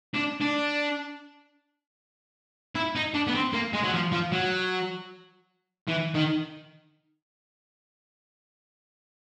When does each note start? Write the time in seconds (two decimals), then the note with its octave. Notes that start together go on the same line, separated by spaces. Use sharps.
0.14 D4
0.41 D4
2.75 E4
2.95 D#4
3.14 D4
3.27 B3
3.35 C4
3.53 A#3
3.73 G#3
3.83 F#3
3.93 F3
4.12 F3
4.32 F#3
5.88 E3
6.15 D#3